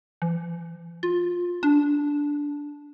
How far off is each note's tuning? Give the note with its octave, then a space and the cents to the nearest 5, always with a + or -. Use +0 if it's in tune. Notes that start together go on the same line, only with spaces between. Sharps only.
E3 +45
F4 +15
D4 -10